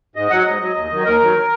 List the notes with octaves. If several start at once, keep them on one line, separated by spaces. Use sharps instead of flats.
G#2 D#5
F#3 F#5
G#2 D#5
F#3
D#2
D#3 F#3
D#2 A#4
D#3 F#3